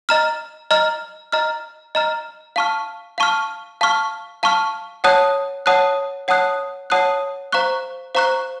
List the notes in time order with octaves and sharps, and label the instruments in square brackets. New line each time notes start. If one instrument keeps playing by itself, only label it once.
[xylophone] D#5 A#5 F6
D#5 A#5 F6
D#5 A#5 F6
D#5 A#5 F6
F5 A5 C#6 F6
F5 A5 C#6 F6
F5 A5 C#6 F6
F5 A5 C#6 F6
C#5 F#5 A5 D#6 F#6
C#5 F#5 A5 D#6 F#6
C#5 F#5 A5 D#6 F#6
C#5 F#5 A5 D#6 F#6
C5 F5 A#5 C#6 F#6
C5 F5 A#5 C#6 F#6